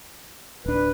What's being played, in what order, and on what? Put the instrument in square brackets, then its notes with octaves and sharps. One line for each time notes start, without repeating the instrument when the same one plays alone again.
[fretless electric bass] D1 D4 [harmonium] B4